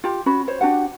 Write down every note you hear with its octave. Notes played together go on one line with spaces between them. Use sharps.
F4 G4
C#4 F#4 B5
C5 C#5
D4 F#4 G4 F#5